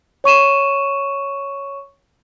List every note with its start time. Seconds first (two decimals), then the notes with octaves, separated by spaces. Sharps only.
0.24 C#5 C#6 D#7 E7